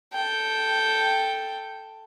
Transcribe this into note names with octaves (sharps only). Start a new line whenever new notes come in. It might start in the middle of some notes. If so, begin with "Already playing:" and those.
A4 G5